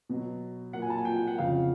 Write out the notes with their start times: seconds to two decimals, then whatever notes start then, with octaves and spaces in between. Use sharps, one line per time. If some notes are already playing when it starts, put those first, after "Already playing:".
0.09 B2 F#3
0.73 A#2 F#3 F#5
0.82 G#5
0.90 A5
0.98 G#5
1.05 G5
1.16 F#5
1.27 F#5
1.38 F2 C#3 F3 F5